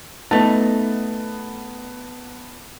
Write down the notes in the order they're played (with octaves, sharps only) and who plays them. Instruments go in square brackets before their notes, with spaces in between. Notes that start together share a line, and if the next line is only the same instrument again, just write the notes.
[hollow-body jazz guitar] A3 D#4 [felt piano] B3 A5 A6